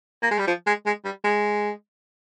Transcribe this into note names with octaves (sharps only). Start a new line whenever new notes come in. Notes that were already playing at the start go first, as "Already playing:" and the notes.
A#3
G#3
G3
F3
G#3
G#3
G3
G#3